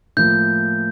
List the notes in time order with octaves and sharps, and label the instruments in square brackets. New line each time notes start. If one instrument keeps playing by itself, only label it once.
[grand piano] A2 F3 A#3 [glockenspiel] G6